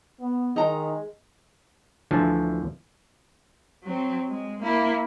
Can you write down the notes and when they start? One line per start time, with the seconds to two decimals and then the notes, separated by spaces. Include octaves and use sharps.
0.20 B3
0.56 D#3 G#3 D#4 A#5
2.11 D2 D3 E3 F3 G#5 A5
3.83 F#3 C4
4.29 G#3
4.62 A#3 E4